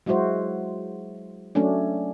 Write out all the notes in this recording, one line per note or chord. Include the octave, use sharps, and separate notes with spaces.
F#3 G#3 E4 F#4 C5
F#3 A3 C#4 D4